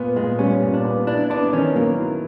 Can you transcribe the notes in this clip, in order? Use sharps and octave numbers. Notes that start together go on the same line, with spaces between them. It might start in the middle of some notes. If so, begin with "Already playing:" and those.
Already playing: A#2 B3
A#2 G#3
G3 C#4
A#2
D4
B3
D4 E4
B3 D4
D#3 C#4
F#3 A#3
E4